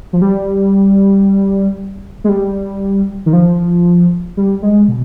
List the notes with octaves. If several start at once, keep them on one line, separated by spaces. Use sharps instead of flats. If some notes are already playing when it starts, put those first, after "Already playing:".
F3
G3
G#3
G3
D#3
F3
G3
G#3
B2